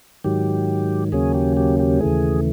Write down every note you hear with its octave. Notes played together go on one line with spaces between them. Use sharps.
G#2 D#3 F#3 G4
D#2 C#3 F#3 A#3 C#4 G#4
G4
G4
G4
D#2 C#3 E3 A3 G#4